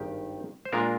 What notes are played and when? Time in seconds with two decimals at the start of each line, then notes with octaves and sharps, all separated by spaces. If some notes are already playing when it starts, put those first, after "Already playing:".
Already playing: G#1 G2 D#3 G4
0.65 C5
0.73 A#2 G#3 D4 F4 A#4